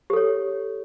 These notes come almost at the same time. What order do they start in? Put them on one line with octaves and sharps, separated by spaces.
G4 A4 C#5